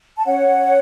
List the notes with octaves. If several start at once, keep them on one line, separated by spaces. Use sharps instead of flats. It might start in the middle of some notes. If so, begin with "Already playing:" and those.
A5
C#4 C#5 F#5
C#4